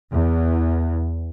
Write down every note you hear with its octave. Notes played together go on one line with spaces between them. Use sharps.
E2